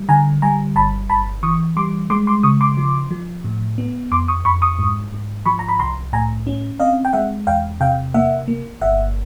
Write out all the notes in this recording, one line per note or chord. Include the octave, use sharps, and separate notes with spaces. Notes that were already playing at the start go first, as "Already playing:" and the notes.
Already playing: G3
D3 G#5 A#5
G3 G#5 A#5
G1 A5 B5
G1 A5 B5
E3 C#6 D#6
G3 C6 D6
G#3 C6 D6
C6 D6
C#3 C#6 D#6
C6 D6
F3
F3
A2
B3
F2 C6 D6
C#6 D#6
F2 B5 C#6
C#6 D#6
G#2
G#2
F3 B5 C#6
A#5
B5
C2 A#5 C6
A2 G#5 A#5
C#4
C4 D#5 F5
G5
G#3 E5 F#5
E2 F5 G5
C3 F5 G5
A#3 E5 F#5
A#3
G1 E5 F#5